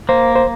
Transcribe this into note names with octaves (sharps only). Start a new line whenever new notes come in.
A#3 C5
C5